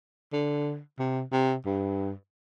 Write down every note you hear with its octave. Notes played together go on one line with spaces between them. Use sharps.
D3
C3
C3
G2